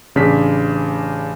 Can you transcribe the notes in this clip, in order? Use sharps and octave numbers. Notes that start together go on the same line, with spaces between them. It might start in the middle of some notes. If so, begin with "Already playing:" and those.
A1 C#3 D4 B6